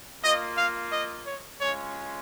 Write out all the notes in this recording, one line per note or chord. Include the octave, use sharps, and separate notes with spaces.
A#3 F4 D#5
F5
D#5
C#5
G#3 C#4 F4 C#5